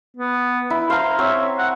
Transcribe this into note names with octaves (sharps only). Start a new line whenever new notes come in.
B3
E4
C5 F5 A#5
C4 C#5 E5
F#5